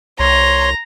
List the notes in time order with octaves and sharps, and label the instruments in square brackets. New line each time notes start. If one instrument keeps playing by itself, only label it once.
[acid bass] C2 [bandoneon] C#5 C6 [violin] A#5